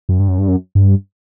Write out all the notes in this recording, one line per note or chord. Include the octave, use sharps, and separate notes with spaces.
F#2
G2
F#2
G2
F#2
G2